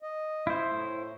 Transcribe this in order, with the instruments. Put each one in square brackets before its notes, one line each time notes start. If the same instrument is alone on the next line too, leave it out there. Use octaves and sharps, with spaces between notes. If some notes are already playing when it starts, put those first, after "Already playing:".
[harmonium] D#5
[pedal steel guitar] E4 C5
[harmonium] A2 A3